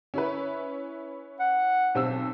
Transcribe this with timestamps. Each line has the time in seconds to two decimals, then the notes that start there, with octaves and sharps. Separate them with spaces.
0.14 C#4 E4 B4
1.39 F#5
1.95 B1 C4 E6